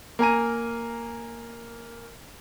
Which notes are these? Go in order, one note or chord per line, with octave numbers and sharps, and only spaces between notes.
A#3 G#5 A#5 D#7